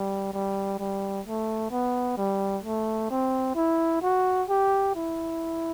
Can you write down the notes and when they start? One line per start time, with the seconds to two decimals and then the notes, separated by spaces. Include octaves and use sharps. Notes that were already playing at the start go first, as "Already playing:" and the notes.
Already playing: G3
0.33 G3
0.79 G3
1.26 A3
1.71 B3
2.18 G3
2.64 A3
3.11 C4
3.56 E4
4.02 F#4
4.49 G4
4.95 E4